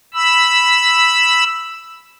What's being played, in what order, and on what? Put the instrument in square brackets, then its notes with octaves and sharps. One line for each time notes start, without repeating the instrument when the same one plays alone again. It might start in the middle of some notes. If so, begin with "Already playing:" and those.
[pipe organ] B5 E6